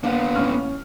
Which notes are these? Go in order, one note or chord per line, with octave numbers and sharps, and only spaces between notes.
A#3 B3 D4 F5 F#5
A1 C#4 F6